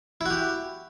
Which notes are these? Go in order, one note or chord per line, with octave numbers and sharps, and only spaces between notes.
E4 F#4 G4